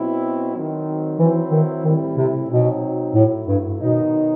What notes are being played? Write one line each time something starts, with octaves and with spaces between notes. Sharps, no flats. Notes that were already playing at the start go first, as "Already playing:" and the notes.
Already playing: B2 F#3 C4 E4
D#3 F#3 C4
E3 F#3 C4 E4
D#3
A2 D#3 G3 C4 E4
C3
B2 F#3 C4 D#4
A2 F#3 A3 E4
G2
B2 D#3 F#3 B3 D#4